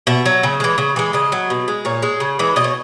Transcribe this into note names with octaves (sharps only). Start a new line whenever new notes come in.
B2 E5
F#3
C#3
E3 G#3
C#3
E3 G#3
C#3 D#5
F#3
B2
G#3
A#2 C#5
G#3
C#3
E3 G#3
B2 D#5
C#5